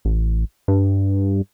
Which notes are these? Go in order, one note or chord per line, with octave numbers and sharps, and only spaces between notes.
A1
G2